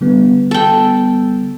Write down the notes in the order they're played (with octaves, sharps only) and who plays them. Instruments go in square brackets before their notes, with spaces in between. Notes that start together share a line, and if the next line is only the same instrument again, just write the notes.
[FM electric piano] D3 G3 B3
[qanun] A4 G5